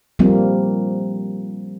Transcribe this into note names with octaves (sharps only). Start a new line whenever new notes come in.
F3 G3 A#3 C4